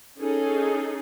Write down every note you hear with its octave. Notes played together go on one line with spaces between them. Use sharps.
C#4 D#4 G#4 A4